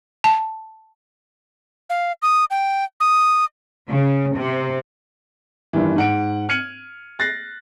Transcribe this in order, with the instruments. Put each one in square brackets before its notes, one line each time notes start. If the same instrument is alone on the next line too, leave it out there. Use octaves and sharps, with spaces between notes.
[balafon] A5
[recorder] F5
D#6
G5
D#6
[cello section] C#3
C3
[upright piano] G1 G2 D#3 E3
G#2 F#5 D7
F6 G#6 C#7 D#7 F#7
F#6 A6 A#6 C7